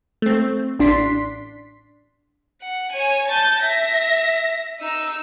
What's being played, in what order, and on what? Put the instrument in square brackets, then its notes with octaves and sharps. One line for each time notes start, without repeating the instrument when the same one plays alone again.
[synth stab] A3 C4
A1 D4 C6 B6
[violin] F#5
C#5 G#5
A5 G6
E5 A#6
D#4 E6